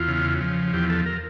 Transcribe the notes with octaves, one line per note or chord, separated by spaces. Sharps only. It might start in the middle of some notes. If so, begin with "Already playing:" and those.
Already playing: E2 F4
C#3
F3
E2 G4
A4
A#4